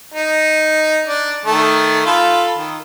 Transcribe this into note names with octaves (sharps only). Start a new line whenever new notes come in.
D#4
D4
D#3 A3
F4 A4 B5
D#3